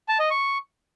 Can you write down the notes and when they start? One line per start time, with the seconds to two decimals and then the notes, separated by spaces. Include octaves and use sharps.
0.08 A5
0.19 D#5
0.30 C#6